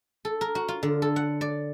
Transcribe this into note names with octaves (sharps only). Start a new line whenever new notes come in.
A4
A#4
F#4
F4
D3
A4
F#5
D5